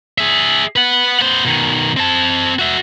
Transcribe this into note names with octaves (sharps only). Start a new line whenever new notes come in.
G#4 E5
B4 F#5
B3 C5
B2 D#3
C4 A5
F#4 E5